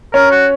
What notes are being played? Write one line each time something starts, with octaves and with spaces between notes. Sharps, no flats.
C#4 A#4
F#4